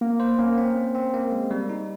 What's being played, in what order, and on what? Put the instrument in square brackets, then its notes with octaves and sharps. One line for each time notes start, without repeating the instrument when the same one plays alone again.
[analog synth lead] A#3
[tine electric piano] C5
[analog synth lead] A#3 [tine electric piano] C#4
[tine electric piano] C4
A#3
C4
A#3
G#3
G3
D#4